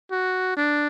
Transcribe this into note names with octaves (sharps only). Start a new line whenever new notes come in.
F#4
D4